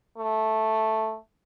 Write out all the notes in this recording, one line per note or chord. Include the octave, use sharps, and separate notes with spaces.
A3